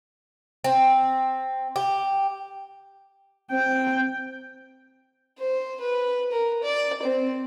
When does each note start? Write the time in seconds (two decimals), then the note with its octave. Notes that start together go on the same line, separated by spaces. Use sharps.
0.64 C4
1.76 G4
3.51 C4 G5
5.38 C5
5.80 B4
6.32 A#4
6.63 D5
7.03 C4